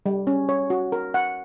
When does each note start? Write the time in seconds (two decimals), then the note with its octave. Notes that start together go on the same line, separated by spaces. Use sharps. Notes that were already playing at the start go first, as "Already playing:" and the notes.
0.06 G3
0.27 C#4
0.49 C#5
0.70 F#4
0.92 A#4
1.14 F#5